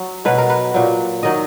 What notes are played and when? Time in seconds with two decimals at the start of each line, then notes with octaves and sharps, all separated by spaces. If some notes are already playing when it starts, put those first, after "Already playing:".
Already playing: F#3
0.25 B2 F#3 B4
0.38 A#4
0.50 B4
0.74 A#2 F#3
1.23 D#3 F#3 D#5